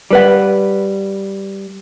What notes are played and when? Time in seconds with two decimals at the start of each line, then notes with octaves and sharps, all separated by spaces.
0.11 G3 B4 F#5